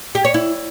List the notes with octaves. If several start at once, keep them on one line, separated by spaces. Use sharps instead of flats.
G4
C#5
E4